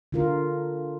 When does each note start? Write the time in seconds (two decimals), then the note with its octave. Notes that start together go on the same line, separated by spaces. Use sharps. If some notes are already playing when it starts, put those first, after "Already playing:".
0.12 D3 F4 A#4